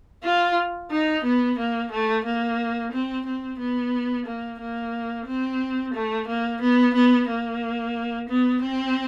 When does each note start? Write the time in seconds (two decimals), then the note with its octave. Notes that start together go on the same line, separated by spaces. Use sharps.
0.23 F4
0.91 D#4
1.24 B3
1.58 A#3
1.91 A3
2.24 A#3
2.92 C4
3.25 C4
3.59 B3
4.26 A#3
4.59 A#3
5.26 C4
5.93 A3
6.27 A#3
6.61 B3
6.94 B3
7.28 A#3
8.28 B3
8.61 C4